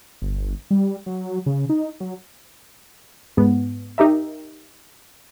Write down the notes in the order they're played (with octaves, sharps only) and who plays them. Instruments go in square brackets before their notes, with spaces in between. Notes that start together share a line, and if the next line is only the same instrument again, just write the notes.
[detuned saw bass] G1
G3
F#3
C#3
D#4
F#3
[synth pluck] G#2 B3
D#4 G4 A#4 E5